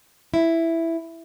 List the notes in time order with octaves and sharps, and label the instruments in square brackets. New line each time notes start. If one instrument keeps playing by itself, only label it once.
[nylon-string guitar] E4